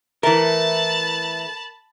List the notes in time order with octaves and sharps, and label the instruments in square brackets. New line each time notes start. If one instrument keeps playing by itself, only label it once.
[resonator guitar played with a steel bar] E3 A3 [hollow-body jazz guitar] A#4 [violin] A5 B5